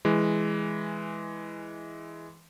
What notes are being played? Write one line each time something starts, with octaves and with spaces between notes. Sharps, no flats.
E3 G#3